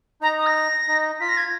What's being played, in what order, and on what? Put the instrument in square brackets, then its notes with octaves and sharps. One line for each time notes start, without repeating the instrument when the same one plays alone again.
[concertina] D#4 [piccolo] A#5
[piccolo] D#6
A#6
[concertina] D#4
[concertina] F4 [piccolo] B6
[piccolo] A#6
G#6